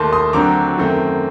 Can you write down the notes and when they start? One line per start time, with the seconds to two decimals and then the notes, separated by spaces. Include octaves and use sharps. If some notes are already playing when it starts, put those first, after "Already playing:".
Already playing: D#2 D#3 A3 A5 C6
0.13 C6 D#6
0.33 D2 D3 F#3 C4 A#5 D6
0.78 F#2 D#3 A3 C4